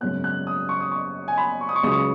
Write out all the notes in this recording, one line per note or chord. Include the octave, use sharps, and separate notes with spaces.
G#1 F#2 C#3 B3 F#6
F#6
D#6
C#6
D#6
C#6
G#5
B5
C#6
D#6
C#6
C#2 C#3 F#3 D#6
C#6